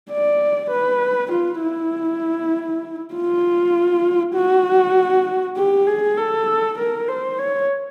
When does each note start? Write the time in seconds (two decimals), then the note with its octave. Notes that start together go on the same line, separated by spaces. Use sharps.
0.10 D5
0.71 B4
1.32 F4
1.62 E4
3.14 F4
4.35 F#4
5.57 G4
5.87 G#4
6.18 A4
6.78 A#4
7.08 C5
7.39 C#5